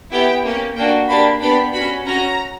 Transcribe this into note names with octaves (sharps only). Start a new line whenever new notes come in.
B3 E4 G4 G5
A#3 C#4 G4
A#3 D4 F#4 G5
A#3 D4 G4 B5
B3 D4 G4 B5
C#4 F#4 B5
C#4 F#4 A#5